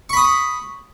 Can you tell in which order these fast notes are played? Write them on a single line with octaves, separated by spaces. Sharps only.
C#6 B5 D#6